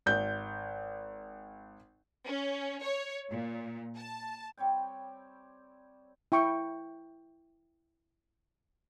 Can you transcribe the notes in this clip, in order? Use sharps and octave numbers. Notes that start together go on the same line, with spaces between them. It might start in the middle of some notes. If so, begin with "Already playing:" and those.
G#1 G6
C#4
C#5
A#2
A5
G3 C4 C#5 G5
E4 G5 C#6